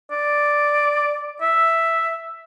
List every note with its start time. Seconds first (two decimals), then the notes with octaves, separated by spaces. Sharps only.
0.11 D5
1.41 E5